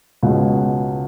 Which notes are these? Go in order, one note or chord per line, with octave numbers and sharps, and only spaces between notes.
C#2 B2 G#3